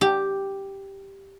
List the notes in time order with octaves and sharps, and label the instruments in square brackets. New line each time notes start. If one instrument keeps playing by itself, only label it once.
[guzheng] G4